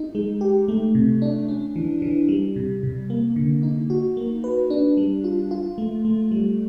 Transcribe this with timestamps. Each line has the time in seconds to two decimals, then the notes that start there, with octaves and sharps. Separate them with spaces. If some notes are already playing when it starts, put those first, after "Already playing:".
Already playing: D#4
0.15 G#3
0.41 G4
0.68 A3
0.95 C3
1.22 D4
1.48 C#4
1.76 E3
2.02 E3
2.28 G3
2.56 C3
2.83 C3
3.10 A#3
3.36 D3
3.63 D#4
3.90 F#4
4.17 A#3
4.44 B4
4.70 D4
4.97 G3
5.24 F4
5.51 F4
5.78 A3
6.05 A3
6.31 G3